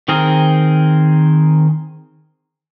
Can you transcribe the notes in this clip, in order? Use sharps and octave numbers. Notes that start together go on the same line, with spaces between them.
D#3 C4 G#4 A#4